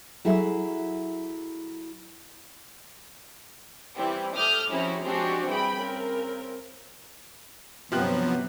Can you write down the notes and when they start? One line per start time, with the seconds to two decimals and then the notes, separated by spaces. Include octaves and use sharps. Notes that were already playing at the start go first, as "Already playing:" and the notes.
0.25 F#3 E4 F#4 G#4 A4 E5
3.98 E3 G3 C4 E4
4.36 A4 E5 D6 D#6 F6 G6
4.71 C3 F3 C#4 E4 F#4 G#4
5.05 F3 G#3 C4 D4 F#4 G4
5.47 C2 E3 G#4 G5 B5
5.79 C#3 C4 A#4
7.92 G1 C3 F3 F#3 B3 G5 F#6